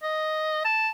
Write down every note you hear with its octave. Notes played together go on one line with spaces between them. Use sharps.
D#5
A5